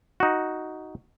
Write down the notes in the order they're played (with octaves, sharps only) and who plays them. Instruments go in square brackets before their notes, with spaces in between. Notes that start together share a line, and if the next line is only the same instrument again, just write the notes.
[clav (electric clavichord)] D#4 F#4